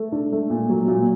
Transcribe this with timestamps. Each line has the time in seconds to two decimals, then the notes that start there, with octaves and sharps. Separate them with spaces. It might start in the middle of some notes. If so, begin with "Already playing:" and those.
Already playing: A3
0.12 D4
0.32 A3
0.50 A#2
0.70 F#3
0.88 A#2